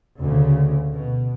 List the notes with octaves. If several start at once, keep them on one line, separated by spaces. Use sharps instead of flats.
D2 C#3
B2